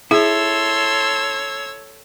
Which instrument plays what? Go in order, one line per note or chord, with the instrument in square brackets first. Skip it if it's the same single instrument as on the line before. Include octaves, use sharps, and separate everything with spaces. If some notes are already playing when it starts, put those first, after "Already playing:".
[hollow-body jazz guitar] E4 [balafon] G#4 [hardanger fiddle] A4 C6 [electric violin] C#5 E6